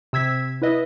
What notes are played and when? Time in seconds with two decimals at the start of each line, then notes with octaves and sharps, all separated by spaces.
0.13 C3 E6 G#6 B6
0.62 E4 B4 D#5 E5